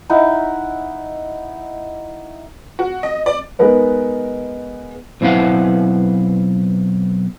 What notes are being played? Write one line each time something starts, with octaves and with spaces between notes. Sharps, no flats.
D#4 E4 F#5
F#4
D#5
D5
G#3 B3 D#4 A#4 B4
B1 C4 E4 B4 F5 F#5